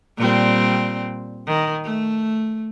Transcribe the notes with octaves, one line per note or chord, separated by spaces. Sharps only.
A#2 G3 C4
D#3
A3